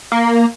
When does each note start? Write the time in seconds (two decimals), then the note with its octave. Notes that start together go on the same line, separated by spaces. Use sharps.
0.12 A#3